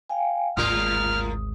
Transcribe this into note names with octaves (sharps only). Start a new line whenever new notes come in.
F5 G5 G#5
G#1 D2 A2 F4 A#4 D#6 F6